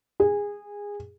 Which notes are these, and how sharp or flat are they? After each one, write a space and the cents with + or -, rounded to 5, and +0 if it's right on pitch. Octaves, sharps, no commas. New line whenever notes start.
G#4 -20